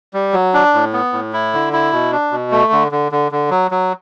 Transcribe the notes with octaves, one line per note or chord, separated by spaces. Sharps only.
G3
F#3
D4
A2
B3
A2
E4
D3
E4
B2
D4
B2
A3
D3
D3
D3
D3
F#3
F#3